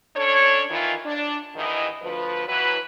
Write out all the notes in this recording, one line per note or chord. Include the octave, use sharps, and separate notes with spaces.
C#4 D4 A4 C#5
D#3 E3 F4
D4
D#2 G#2 D#3 E3 E4 D#5
D2 F3 B4
E3 F#3 B4